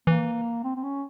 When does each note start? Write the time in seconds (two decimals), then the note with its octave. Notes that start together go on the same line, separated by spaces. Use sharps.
0.07 E3 A#3
0.64 C4
0.76 C4
0.83 C#4